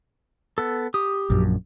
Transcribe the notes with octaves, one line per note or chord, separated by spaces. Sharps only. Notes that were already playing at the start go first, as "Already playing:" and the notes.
B3 A4
G4 D#6
A#1 F#2